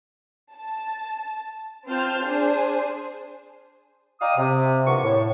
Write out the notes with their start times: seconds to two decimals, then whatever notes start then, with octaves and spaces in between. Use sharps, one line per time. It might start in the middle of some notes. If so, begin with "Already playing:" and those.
0.55 A5
1.88 C4 F4 C5 A5 F6 G6
2.23 D4 G#4 C5
4.21 D#5 F5 G5 A#5 D6 D#6
4.37 C3
4.86 D3 E3 F3 A#3 B3 C#6
5.03 A2